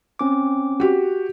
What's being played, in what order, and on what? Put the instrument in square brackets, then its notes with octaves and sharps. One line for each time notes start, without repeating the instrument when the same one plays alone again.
[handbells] C4 C#4 D6
[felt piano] F#4 G4